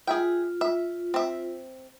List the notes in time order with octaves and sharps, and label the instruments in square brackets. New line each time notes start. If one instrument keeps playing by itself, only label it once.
[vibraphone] F4 [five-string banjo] G#4 E5 G5
[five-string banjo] E5
C4 E5